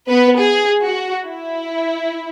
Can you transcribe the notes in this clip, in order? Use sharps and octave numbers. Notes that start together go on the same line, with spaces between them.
B3 B4
G#4
F#4
E4